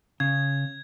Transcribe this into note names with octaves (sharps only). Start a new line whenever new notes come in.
C#3 G#6